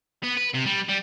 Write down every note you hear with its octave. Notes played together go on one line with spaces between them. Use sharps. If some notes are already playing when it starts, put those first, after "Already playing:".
B3
B4
C3
G3
G3